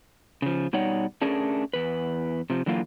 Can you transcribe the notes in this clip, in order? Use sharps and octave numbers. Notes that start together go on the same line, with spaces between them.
C#3 F3
B2 G3 D#4 C#5 D5 F#5
A3 C#4 D4 G#4 A#4
E2 B4
C3 F3
D3 E3 F#3 A#3 F4